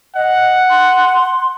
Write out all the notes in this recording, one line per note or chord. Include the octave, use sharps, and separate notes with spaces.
D#5 F#5
C6